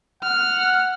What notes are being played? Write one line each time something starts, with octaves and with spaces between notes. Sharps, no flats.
F#5 F6